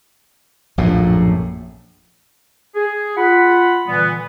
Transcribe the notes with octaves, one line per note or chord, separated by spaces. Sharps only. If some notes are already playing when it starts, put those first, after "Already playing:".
A#1 F#2 A2
G#4
F4 F#5 B5
A#2 D3 E3 G3 B3